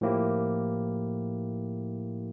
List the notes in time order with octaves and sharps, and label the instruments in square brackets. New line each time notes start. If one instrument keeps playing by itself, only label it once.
[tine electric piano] A2 F3 A#3 E4 G4